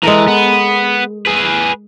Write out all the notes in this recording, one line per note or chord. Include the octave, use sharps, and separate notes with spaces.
E3 G#3 A4 A#4
B3
G#4 B4